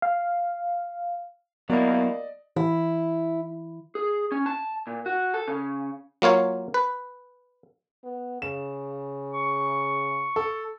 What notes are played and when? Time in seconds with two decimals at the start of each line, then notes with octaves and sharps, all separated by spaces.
0.02 F5
1.70 F#3 A#3 B3 E4 D5 D#5
2.56 E3 E4
3.95 G#4
4.32 C#4
4.46 A5
4.87 A#2
5.06 F#4
5.34 A4
5.48 C#3
6.22 F#3 A#3 F4 C#5 F5
6.74 B4
8.04 B3
8.42 C#3 E7
9.33 C#6
10.36 A4